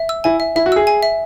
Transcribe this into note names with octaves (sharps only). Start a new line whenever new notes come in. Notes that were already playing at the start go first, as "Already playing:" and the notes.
Already playing: E5
E6
E4 G#5
E5
E4 E5
F#4
G#4 E6
G#5
E5